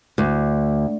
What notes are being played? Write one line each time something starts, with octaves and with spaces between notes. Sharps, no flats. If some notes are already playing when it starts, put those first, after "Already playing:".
D2